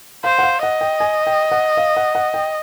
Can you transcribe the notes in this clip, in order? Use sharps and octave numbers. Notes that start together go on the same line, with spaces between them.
C5 F5
F#5
F5
D#5 F#5
G5
G#5
G5
F#5
F5
F#5
F#5
G5